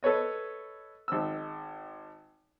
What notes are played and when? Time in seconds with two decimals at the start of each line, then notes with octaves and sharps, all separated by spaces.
0.03 A4 B4 C#5 D#5
1.08 G#1 E6